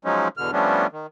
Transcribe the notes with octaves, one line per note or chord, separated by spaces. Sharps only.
F3 F#3 G#3 C#4 D#4
E2 B2 D3 F6
F3 G3 A3 B3 C#4 D4
D#3